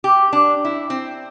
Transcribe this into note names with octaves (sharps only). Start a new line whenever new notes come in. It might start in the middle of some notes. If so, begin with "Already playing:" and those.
G4
D4
E4
C4